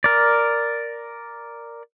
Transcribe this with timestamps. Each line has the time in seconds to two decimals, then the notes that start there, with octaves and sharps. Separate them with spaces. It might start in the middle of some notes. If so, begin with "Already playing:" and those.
0.04 A#4 D5